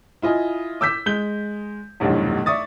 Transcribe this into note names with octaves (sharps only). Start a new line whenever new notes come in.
E4 F4 D#5 G#5
D6 E6 G6 B6
G#3 G6 G7
F1 B1 E2 G2
D5 E5 C#6 D#6 A6